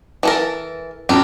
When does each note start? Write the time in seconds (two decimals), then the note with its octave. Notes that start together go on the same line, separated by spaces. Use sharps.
0.23 E3 A4 A#4
1.09 F1 F#2 G4 A5